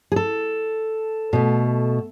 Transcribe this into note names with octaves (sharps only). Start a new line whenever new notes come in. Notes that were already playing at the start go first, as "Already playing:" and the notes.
G#4
A4
B2 A3